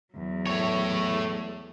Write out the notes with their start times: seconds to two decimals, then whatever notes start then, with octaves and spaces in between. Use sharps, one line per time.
0.14 E2 F#3
0.47 A3 C#5